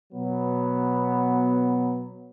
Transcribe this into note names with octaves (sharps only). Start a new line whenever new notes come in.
B2 F#3 B3